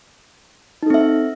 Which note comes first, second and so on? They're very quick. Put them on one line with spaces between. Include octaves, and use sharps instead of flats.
D#4 A4 C4 E5